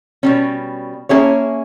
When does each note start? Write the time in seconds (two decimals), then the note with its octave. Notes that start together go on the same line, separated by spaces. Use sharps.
0.23 B2 G3 C#4
1.09 A#3 C#4 E4 G#4 C#5